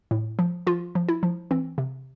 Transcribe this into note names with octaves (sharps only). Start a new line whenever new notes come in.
A2
F3
F3 F4
F3
E4
F3
E3 C4
C3